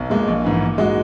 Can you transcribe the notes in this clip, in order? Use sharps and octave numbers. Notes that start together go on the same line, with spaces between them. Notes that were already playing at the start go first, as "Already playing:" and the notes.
Already playing: B1
A#2 G#3
A#1
G#2 E3
A#2
G#3 D#4 F#4